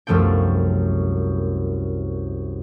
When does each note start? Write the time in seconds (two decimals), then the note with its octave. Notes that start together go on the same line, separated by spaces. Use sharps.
0.07 C2 F#2 F3 A3 B3 G5